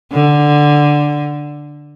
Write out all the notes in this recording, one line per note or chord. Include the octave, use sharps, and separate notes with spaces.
D3